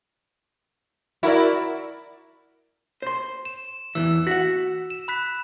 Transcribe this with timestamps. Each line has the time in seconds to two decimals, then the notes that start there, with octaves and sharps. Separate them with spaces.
1.23 E4 F#4 A#4 D5
3.02 C5 C6
3.45 E7
3.95 E2 D#3 E3 E6
4.27 F#4 F#5 B6
4.90 E7
5.08 B5 F#6 B6